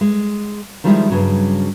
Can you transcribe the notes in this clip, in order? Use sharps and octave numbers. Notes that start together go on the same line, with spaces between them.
G#3
D#3 F3 G3 G#3 E4
G2 C#3 F#3